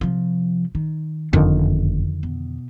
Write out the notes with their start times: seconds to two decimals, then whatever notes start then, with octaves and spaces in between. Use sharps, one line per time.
0.01 C3 F3
0.75 D#3
1.33 F#1 F2 D3 D#3
2.23 B2